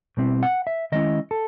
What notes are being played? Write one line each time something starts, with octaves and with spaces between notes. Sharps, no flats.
B2 G3 C4 E4
F#5
E5
D#3 G#3 C#4 E4 D#5
A4